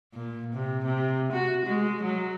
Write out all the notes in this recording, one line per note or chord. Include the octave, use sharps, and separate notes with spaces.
A#2
C3
C3
F#4
G#3
F#3